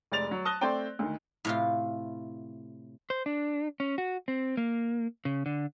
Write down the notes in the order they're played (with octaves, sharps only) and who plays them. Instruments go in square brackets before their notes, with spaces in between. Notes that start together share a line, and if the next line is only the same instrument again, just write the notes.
[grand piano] F1 G#3 D5 A6 F7
F#3
A5 D#6 F#6 A#6 G7
A3 C4 C5 D5 G5
D2 D#3
[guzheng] A2 C3 F4
[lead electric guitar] C5
D4
C#4
F#4
C4
A#3
C#3
D3